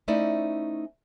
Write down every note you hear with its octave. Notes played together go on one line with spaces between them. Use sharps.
A3 C#4 D#4 E4 C5 D5